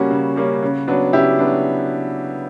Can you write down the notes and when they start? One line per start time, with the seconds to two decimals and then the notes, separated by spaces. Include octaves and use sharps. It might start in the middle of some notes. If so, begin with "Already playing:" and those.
Already playing: C#3 G3 A#3 C#4 F#4
0.11 C#3
0.36 G3 A#3 C#4
0.63 C#3
0.87 F#3 B3 D4
1.13 C#3 E4 G4
1.39 F#3 B3 D4